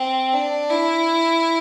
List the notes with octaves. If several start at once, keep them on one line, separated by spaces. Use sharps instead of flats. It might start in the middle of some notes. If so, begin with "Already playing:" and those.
Already playing: C4
D4
E4